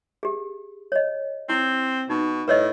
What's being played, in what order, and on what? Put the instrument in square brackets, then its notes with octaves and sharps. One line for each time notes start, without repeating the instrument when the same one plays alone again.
[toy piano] G4 G#4
C#5 D#5
[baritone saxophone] C4 [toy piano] E4
[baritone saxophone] B2 [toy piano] D#4
[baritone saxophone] A2 [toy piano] B4 C#5 D#5